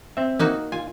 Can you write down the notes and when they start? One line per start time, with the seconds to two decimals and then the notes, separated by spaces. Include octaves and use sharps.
0.17 C4 E5
0.39 A#3 D#4 F#4
0.72 F4 G#5